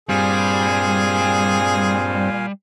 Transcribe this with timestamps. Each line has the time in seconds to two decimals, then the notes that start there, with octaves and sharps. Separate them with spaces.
0.09 G2 A#2 G3 C4 G#4 F5 G#5